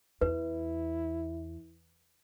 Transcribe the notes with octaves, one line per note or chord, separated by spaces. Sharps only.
E2 E4 B4